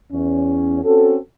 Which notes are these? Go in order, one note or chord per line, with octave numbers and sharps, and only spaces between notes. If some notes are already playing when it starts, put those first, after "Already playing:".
E2 C#4
C4 C#4 F#4 A4